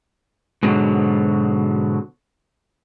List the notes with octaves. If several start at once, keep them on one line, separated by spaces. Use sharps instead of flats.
G#2 B2 D3 F#3